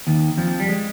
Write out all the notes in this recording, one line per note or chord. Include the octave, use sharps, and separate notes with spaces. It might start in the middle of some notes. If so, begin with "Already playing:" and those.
D#2 D#3
F2 F3
G3
G#3